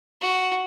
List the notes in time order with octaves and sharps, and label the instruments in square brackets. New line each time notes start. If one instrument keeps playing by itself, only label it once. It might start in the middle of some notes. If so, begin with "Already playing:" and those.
[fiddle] F#4